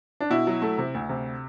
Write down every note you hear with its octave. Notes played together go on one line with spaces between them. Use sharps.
D4
B2 E4
F#3
A3
C3
D2
C3